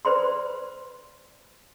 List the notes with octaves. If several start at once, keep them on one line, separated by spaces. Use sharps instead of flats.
B4 C5 D5 B5 C6